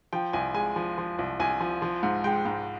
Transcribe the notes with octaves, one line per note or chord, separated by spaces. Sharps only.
F3 G5
C2 G#5
G#3 G#5
F3
F3
C2
C2 G#5
F3
F3
G#2
G#3 G5
G#2